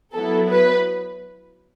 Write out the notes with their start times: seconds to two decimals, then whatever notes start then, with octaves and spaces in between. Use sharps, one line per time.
0.12 F#3 B3 E4 A4
0.49 B4